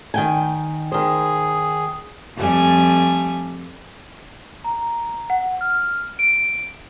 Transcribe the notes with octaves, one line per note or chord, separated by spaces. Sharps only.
D#3 G5 G#5
D#3 G#4 C5
F2 G3 A3 G#5
A#5
F#5
F6
D7